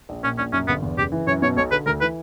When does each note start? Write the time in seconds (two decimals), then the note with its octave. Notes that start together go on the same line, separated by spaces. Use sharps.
0.09 A#1
0.23 A#2 C#4
0.38 A#1 C#4
0.53 F#2 C#4
0.68 G1 B3
0.82 E2
0.97 F#1 G4
1.12 E3
1.27 F#2 C#5
1.42 B2 C#5
1.57 B1 C#5
1.71 D3 B4
1.86 D2 A#4
2.01 E3 B4